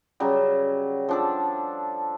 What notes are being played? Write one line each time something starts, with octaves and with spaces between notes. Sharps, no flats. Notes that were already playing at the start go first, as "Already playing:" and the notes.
C#3 F#3 G3
F3 D4 A4